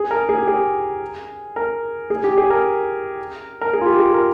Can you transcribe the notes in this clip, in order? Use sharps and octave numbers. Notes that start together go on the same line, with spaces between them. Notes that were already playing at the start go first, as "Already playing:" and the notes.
Already playing: G#4
A#4
G#4
G4
G#4
A#4
G#4
G4
G#4
A#4
A#4
G#4
F4
G4
G#4
A#4